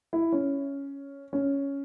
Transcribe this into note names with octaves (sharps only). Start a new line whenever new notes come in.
E4
C#4
C#4